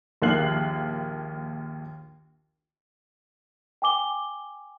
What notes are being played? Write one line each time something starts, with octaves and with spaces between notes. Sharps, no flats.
A#1 D#2 A#3 F#6 C7 F#7
G5 G#5 D6 G7